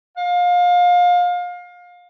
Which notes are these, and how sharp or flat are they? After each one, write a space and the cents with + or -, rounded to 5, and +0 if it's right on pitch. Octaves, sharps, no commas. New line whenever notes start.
F5 +25